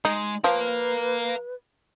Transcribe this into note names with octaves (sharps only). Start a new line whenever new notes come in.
G#3 D#4
F3 A#4 B4 F5